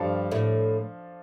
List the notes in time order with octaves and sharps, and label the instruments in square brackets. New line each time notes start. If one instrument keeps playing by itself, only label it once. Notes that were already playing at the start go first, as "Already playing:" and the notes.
Already playing: [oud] G2 G3 [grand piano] F3 D4 A4 F5
[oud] A2 A3